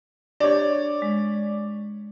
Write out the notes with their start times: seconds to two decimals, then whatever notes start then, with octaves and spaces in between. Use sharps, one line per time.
0.40 D4 G4 C#5 D5
1.02 G#3